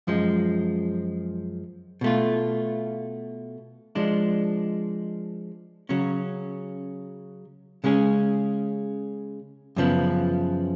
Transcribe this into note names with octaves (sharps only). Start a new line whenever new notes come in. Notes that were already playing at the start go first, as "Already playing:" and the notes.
F#2 F3 G#3
B2 A3 F4
F3 G#3 D4
C#3 F#3 C#4
C#3 G#3 C#4 G#4
F#2 C#3 F3 B3